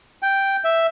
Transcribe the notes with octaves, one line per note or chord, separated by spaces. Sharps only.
G5
E5